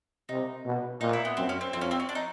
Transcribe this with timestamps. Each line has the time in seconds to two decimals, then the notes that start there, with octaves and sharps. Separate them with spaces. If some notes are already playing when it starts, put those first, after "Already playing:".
0.29 C3 D#4
0.65 B2
1.01 A#2 D#4
1.13 E4
1.25 B3
1.37 F#2 C4
1.49 C#4
1.61 C4
1.73 F2 C4
1.81 C#4
1.91 C4
2.00 C#4
2.09 D4
2.15 D#4